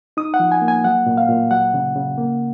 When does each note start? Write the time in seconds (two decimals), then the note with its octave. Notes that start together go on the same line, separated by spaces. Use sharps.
0.17 D#4 D#6
0.34 F#5
0.40 F3
0.52 G#5
0.62 A#3
0.68 G#5
0.84 F#3 F#5
1.06 A#2
1.17 F5
1.28 A#2
1.51 F#3 F#5
1.74 C#3
1.96 C#3
2.18 A#3